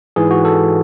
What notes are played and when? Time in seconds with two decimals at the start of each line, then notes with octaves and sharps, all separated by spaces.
0.16 G#2 E3 G#4
0.31 F#4
0.45 A4